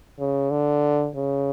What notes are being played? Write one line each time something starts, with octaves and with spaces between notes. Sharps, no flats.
C#3
D3
C#3